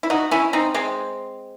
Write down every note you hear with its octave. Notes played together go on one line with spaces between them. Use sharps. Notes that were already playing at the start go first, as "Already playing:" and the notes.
E4
D#4 F#4
C#4 E4
C4 D#4
G#3 C4